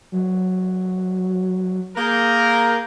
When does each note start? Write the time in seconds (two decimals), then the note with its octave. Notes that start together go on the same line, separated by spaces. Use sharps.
0.12 F#3
1.97 A#3 G#4 A#4 G6